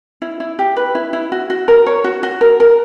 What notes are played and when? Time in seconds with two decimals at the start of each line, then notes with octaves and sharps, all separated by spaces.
0.22 E4
0.40 E4
0.59 G4
0.76 B4
0.95 E4
1.13 E4
1.32 F#4
1.50 F#4
1.68 A#4
1.86 C#5
2.04 F#4
2.23 F#4
2.41 A#4
2.60 A#4